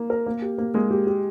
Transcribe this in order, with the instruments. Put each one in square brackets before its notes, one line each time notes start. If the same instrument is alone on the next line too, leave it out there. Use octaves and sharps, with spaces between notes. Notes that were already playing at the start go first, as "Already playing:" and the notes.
Already playing: [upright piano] A#3
[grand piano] A#4
A#3
G4
A#3
[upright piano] G#3 [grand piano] A#3
[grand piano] G4
G4